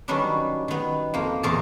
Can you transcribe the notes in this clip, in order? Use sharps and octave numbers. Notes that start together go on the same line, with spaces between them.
D#3 F#3 G3 B3 C#4 D4
D#3 B3
F2 A#3
E2 A#2 A#4 D#5 A5